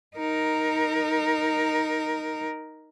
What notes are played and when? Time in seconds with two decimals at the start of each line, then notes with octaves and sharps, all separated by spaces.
0.16 D#4 A#4